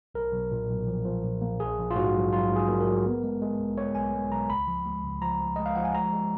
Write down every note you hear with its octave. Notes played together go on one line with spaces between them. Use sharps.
B1 A#4
B1
A#2
B1
F3
F3
A#2
A#3
A#1 G#4
A#1
F4
G#2 F#4
F#3
F#3 F4
G#2
G#4
A#3
A#4
F#3
B3
G#3
G#3
B1
G#3 C#5
B1 G#5
G#3
B1 A#5
C#2 B5
F3
G#3
C#2
F3 A#5
F3
G#3 D#5
F5
F3 F#5
G#5
G#3 A#5
G#3